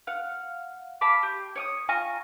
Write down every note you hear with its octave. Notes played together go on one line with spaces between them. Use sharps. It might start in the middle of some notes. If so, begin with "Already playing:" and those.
F5 F#5
F5 A5 B5 D6
G4
C#5 D6 D#6
F4 G#5 A#5 C#6